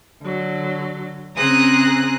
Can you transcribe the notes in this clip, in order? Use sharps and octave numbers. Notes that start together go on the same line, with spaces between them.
D3 F#3
C#3 C4 G#4 A#5 D#6 F#6